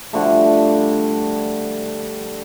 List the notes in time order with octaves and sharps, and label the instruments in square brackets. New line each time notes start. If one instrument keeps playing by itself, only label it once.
[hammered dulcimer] D3 F3 G3 A3